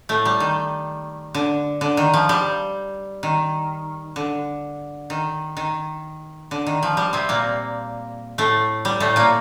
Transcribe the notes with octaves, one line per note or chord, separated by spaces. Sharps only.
A2 A3
G3
D#3
D3
D3
D#3
F3
G3
D#3
D3
D#3
D#3
D3
D#3
F3
G3
C3 C4
A#2 A#3
A2 A3
G3
A2 A3
A#2 A#3